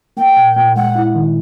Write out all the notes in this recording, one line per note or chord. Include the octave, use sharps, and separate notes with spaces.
A#3 G5
A#2
A#2
G#3 F#5
E4
D#3